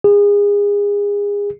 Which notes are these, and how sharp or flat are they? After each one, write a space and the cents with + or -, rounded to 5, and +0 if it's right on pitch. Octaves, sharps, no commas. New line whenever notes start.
G#4 -30